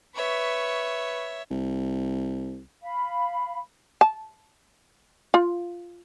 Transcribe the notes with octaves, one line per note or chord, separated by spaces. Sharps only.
B4 C#5 E5 C#6
C2
F5 B5
A5
F4